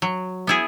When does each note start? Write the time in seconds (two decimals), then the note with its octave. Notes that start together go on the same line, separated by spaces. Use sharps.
0.02 F#3
0.47 B3 E4 G#4